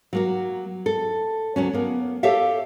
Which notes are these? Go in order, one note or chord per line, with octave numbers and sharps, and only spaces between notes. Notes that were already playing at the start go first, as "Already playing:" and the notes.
F#3 A#3 F#4
A4
D2 G#2 F#3 C#4
A#3 B3
G4 A4 C#5 E5 F5